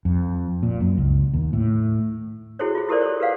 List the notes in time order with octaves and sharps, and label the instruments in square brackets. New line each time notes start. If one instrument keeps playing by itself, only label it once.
[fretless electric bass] F2
A#2
F#2
C#2
D#2
A2
[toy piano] E4 F#4 G#4 A4 C5 C#5
F4 G#4
E4 G4 A4 A#4 C5 D5
A4 C5 C#5
G4 B4 F5 F#5